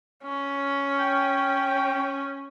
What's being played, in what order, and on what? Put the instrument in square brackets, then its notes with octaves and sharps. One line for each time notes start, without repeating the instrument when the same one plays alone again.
[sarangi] C#4
[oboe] G5